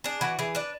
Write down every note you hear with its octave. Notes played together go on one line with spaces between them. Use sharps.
D4 G#4
E3 F#4
E3 G#4
D4 B4